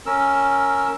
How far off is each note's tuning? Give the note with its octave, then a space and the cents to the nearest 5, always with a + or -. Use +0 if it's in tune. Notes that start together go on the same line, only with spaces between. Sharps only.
C#4 +0 A#4 +0 E6 +0